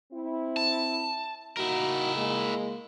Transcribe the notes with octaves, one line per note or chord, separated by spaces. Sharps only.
C4 E4
A5
A#3 D#4 E4 F#4 A#4
G#3 A#3